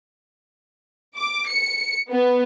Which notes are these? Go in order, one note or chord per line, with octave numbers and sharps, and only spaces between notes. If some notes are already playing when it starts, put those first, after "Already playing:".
D6
C#7
B3